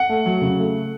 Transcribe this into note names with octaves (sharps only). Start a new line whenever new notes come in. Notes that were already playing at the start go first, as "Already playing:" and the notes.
Already playing: F#5
A3
F#3
C#3
A3